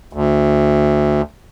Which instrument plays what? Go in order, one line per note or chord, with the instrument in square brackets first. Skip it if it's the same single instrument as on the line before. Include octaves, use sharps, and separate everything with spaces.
[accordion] D2